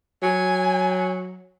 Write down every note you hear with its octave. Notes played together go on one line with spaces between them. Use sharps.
F#3 G#5